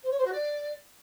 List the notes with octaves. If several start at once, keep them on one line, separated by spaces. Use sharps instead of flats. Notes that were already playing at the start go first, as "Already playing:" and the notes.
C5
C#5
C5
F#4
D5